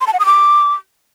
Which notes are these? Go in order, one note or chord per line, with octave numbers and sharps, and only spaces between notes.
C6
A5
F#5
D#6
D6